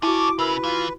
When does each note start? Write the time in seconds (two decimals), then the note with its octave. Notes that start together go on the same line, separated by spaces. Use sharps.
0.03 E4 F#4 G#4 C#5 A5 C#6 D6
0.39 C#3 A#4 B4 E5 E6
0.64 E3 F4